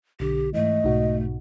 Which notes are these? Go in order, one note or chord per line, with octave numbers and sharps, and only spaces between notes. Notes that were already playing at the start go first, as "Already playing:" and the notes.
B1 D3 G4
G#2 E3 A3 D#5
B1 G#2 B2 D#4 F#4